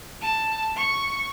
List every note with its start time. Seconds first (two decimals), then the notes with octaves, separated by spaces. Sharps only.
0.21 A5
0.76 C#6